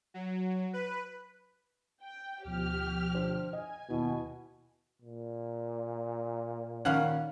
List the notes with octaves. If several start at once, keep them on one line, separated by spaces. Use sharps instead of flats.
F#3
B4
G5
D2 B2 F3 G4 F6
D4 C5
D#5 G#5
D#2 B2 E4
A#2
D#3 G3 C#4 F5 F#5